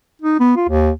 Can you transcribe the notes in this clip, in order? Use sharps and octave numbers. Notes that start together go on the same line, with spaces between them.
D#4
B3
F4
D#2